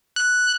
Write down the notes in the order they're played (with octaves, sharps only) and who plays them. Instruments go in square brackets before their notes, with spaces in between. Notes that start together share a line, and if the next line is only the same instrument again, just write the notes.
[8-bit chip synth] F#6